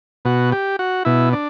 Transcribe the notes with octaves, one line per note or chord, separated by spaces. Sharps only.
B2 F#4
G4
F#4
B2 E4
D4